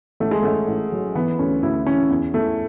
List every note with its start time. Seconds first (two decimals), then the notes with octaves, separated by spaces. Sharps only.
0.20 A1 A3
0.31 G#3
0.42 A1 A3
0.68 A1
0.92 F#3
1.15 E3 B3
1.39 D2 C#4
1.62 D2 E4
1.86 E3 C#4
2.11 E2
2.34 E2 A3